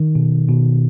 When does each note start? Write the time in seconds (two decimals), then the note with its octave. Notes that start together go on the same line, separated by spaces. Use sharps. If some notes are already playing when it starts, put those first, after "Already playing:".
Already playing: D#3
0.15 B2
0.48 B2